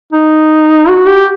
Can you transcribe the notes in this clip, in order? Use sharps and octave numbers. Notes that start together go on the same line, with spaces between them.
D#4
F#4
G4